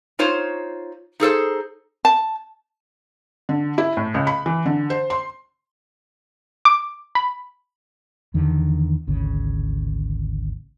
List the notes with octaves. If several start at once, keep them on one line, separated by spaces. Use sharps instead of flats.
D#4 F4 C5 C#5
D#4 G#4 A4 C5
A5
D3
E4
A2
C#2
B5
E3
D3
C5
C6
D6
B5
E2 D3 D#3
G#1 D2 C#3